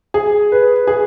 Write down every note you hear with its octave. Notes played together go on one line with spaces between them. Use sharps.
G#4
B4
G#4